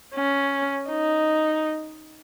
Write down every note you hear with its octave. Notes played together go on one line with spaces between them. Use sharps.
C#4
D#4